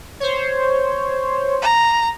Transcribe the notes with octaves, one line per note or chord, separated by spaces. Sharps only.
C5 C#5
A#5